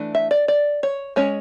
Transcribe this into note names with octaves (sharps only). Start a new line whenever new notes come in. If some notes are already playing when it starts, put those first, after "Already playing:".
Already playing: E3 A3 D4
E5
D5
D5
C#5
G#3 C#4 C#5